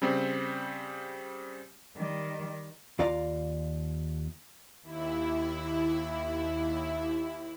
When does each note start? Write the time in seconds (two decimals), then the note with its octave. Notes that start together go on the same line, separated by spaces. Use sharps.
0.02 C#3 G3 C4
1.96 D#3 G3
2.99 D#2 F4 D5 F5 A#5
4.83 D#2 E4